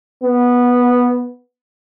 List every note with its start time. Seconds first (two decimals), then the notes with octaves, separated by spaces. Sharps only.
0.23 B3